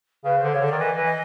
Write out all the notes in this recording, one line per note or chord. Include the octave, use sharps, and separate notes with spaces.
C#3 B4
D3 C5
C#3 C#5
D3
D5
D#3
E3 D#5
E3
D#5